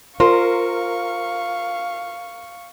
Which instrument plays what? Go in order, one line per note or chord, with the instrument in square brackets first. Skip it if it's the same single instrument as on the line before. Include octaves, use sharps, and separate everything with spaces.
[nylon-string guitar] F4 [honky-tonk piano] A#4 [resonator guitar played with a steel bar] C5 [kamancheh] F5 C#6